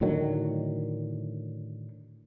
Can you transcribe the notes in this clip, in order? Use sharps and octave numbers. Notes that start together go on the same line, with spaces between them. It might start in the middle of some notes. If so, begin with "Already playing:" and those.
A2 D3 D#3 F#3